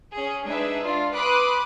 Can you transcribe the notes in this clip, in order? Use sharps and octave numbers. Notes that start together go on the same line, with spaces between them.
C#4 G#4
G#3 D4 D#4 G#4 B4 E5
D4 F4
B4 B5 C6 D6 D#6 F#6